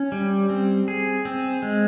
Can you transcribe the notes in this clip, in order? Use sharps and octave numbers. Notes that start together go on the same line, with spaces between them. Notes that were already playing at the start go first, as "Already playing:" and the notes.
Already playing: C#4
G3
C4
G#4
C4
G#3